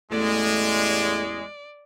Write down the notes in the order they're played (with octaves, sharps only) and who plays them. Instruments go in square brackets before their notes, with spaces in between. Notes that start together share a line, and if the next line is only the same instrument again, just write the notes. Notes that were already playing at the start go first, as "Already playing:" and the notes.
[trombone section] A1 E2 [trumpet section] G#3 [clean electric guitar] A3 [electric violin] D5